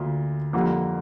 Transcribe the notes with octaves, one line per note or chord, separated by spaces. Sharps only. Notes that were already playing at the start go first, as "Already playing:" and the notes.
Already playing: D2 A#3 F4
F2 D3 G3 A#3